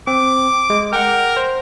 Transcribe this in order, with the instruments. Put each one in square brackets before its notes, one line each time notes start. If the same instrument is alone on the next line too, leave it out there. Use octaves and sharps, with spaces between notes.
[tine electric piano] C4 [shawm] D6
[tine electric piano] G#3
[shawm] A#4 [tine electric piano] F#5 G5
[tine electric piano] C5